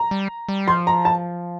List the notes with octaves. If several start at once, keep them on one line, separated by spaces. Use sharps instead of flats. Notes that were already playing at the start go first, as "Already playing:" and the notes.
Already playing: A#5
G3
G3
F3 C6
A#5
A5